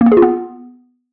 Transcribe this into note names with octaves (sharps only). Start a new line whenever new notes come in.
A#3
B3
G#4
F4
B3